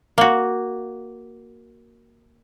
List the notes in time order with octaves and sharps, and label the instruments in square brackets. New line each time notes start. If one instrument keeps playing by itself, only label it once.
[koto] A#3 F#4